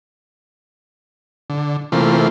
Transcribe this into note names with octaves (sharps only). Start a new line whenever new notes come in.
D3
C3 E3 A3 A#3 C4 F4